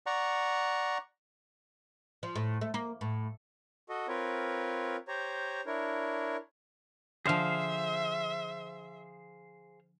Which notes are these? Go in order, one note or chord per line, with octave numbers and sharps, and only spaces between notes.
D5 F#5 A#5 C#6
F3
A2
A3
A#3
A2
F#4 A4 D#5
C4 F4 A#4 B4 C#5
G4 C5 C#5 A#5
D4 E4 A#4 C#5
D3 F3 G#4 C5 E5 F5